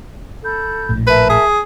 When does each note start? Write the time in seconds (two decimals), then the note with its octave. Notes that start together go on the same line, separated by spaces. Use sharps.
0.43 A4 B5 G6
0.89 A#1 A2
1.07 A#4 B4 E5 A5
1.30 G#4